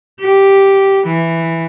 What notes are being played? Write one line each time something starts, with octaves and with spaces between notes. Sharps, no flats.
G4
E3